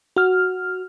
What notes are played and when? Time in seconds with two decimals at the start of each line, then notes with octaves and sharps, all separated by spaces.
0.16 F#4 F6